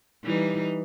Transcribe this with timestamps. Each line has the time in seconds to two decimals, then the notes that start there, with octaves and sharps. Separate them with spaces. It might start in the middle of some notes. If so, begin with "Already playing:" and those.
0.24 E3 G3 D#4